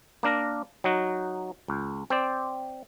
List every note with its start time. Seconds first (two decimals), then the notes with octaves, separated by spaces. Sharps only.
0.23 A#3 D4 A#4 A#5
0.84 F#3 D#4 F#4
1.68 C#2
2.10 C4 C5 D5